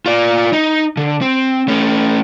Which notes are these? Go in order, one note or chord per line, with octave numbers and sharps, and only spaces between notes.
F4 D5
D#4
D3
C4
A3 C#4